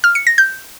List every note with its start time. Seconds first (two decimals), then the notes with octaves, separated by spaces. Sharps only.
0.04 F6
0.15 C#7
0.27 A#6
0.38 G6